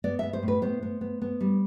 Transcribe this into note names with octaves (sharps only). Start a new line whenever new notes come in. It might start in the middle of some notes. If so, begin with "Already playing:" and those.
B3 D5
B3 E5
C5
A2
B4
B3 C5
B3
B3
B3
G3